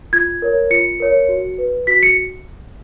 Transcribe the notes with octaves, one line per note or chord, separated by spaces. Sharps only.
F4 G#6
A#4 C#5
F4 C#7
A#4 C#5
F#4
B4
F#4 B6
C#7